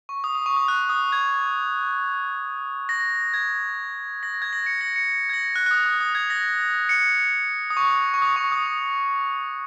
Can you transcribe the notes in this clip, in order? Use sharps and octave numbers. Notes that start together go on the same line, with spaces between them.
C#6
D#6
D#6
C#6
D#6
F#6
D#6
G#6
A#6
G#6
A#6
G#6
A#6
C#7
A#6
C#7
C#7
G#6
A#6
F#6
F#6
D#6
D#6
D#6
G#6
A#6
C#7
D#6
C#6
C#6
D#6
C#6
D#6
D#6